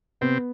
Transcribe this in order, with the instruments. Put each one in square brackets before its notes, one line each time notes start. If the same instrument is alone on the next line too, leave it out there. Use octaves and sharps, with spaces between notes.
[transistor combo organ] C3 C4 [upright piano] B3